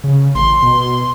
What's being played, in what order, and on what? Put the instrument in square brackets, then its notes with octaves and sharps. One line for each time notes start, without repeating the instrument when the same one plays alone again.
[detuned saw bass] C#3
[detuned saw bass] A1 [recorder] C6
[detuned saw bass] B2